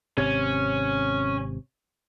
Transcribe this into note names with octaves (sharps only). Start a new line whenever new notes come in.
G#1 C3 C#4